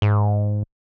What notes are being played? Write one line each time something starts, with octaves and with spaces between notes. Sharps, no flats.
G#2